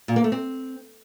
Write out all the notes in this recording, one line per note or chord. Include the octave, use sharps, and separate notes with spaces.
A#2
A#3
A3
C4